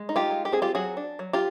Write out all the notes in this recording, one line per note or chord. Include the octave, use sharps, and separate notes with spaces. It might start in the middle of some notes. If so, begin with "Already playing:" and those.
Already playing: G#3
D#4
F4 G4
G#3
G4
C4 G#4
F4 G4
F#3 F#4 G#4
D4
F#3
F4 G4